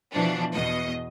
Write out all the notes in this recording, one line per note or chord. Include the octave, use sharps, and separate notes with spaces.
B2 E3 F3 D4
E2 B2 D#5